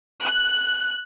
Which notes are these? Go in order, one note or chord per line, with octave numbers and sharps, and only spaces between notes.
F#6